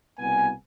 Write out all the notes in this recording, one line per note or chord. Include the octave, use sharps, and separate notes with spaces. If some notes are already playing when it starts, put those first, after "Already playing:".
C2 B2 G3 B3 G#5